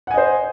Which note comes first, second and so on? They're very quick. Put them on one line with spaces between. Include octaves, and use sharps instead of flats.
F#5 G#5 D#5 C5